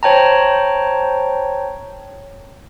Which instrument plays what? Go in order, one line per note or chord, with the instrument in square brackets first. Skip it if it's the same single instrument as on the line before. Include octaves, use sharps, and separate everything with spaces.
[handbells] C5 C#5 G5 A5 A#5